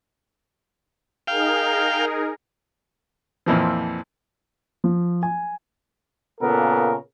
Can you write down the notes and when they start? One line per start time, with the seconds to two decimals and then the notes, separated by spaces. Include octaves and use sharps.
1.27 D#4 G#4 A#4 F5 G5
3.46 F2 A#2 E3 F3
4.84 F3
5.23 G#5
6.40 A#2 C#3 B3 A4 A#4